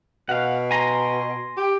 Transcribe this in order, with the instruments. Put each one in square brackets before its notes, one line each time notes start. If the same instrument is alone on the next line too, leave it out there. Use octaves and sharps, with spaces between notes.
[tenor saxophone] B2 [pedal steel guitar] F5 F#5
[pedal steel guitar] G#5 A#5 C6
[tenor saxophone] G4